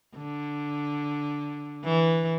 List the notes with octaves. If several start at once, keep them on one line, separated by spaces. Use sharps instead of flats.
D3
E3